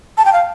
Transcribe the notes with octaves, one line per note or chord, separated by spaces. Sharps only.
A5
G5
F5